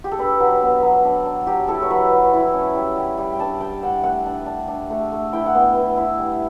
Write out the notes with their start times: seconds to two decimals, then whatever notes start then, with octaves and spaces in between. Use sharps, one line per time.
0.04 G4
0.12 A4
0.18 D4 B4
0.40 F#3
0.62 B3
0.82 F#3
1.05 D4
1.25 D4
1.47 F#3 G4
1.68 E4 A4
1.82 C#5
1.90 F#3 B4
2.12 F#3
2.33 E4
2.54 C#4
2.75 G3
2.97 G3
3.18 G3
3.33 G5
3.39 D4 A5
3.61 G3 G5
3.82 D4 F#5
4.04 A3 F#5
4.26 D4
4.46 D4
4.68 D4
4.90 A3
5.12 A3
5.33 E4 G5
5.46 F#5
5.55 B3
5.60 G5
5.75 E4
5.97 E4
6.19 G3